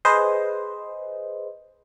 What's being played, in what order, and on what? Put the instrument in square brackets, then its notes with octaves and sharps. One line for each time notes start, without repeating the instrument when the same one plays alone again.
[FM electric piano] G#4 B4 C5 D#5